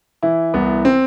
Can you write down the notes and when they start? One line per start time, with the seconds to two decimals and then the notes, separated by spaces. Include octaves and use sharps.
0.23 E3 E4
0.54 C2 B3
0.85 C4